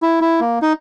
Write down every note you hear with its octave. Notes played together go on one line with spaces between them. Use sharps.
E4
E4
A#3
D#4